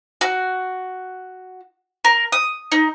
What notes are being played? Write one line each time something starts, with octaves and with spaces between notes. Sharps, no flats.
F#4
A#4
D#6
D#4